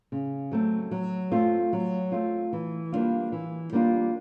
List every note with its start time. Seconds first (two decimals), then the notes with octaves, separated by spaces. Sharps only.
0.12 C#3
0.52 F#3 A3 C4
0.91 F#3
1.31 A3 C4 F4
1.73 F#3
2.12 A3 C4 F4
2.53 E3
2.92 G3 A#3 D4 F4
3.32 E3
3.72 G3 A#3 D4 F4